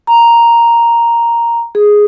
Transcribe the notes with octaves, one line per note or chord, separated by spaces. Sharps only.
A#5
G#4